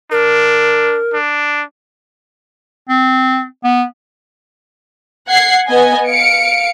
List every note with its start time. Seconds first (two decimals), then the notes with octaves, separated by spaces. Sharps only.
0.11 D4 A#4
1.13 D4
2.89 C4
3.64 B3
5.28 F#5 G#6 C7
5.68 B3 D#5 G#5
6.07 F5 C#7 D7